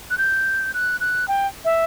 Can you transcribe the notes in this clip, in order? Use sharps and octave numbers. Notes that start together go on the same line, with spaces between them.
F#6
G6
F#6
F#6
G5
E5